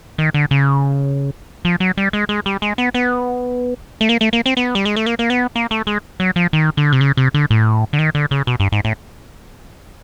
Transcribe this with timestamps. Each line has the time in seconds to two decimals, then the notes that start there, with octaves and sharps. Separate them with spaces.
0.18 D#3
0.34 D3
0.51 C#3
1.65 F3
1.80 F#3
1.97 G3
2.13 G#3
2.29 G#3
2.46 G3
2.62 G#3
2.78 B3
2.94 B3
4.01 A3
4.09 A#3
4.21 A3
4.33 A#3
4.46 C4
4.57 B3
4.75 G3
4.85 G#3
4.96 A3
5.06 A#3
5.19 A#3
5.30 B3
5.56 A#3
5.71 A3
5.87 G#3
6.20 F#3
6.36 F3
6.53 D#3
6.77 D3
6.92 C3
7.01 C#3
7.17 C3
7.34 D3
7.50 A2
7.93 D3
7.99 D#3
8.15 D3
8.31 C#3
8.47 B2
8.60 G2
8.72 G#2
8.85 A2